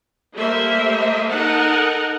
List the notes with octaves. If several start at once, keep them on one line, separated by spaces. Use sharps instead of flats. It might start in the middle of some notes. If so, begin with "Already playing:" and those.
G3 A3 A#3 C5 E5
D#4 A4 A#4 F#5